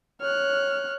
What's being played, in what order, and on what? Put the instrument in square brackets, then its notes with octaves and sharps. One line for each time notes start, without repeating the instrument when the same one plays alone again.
[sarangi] C#5 [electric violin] F6 F#6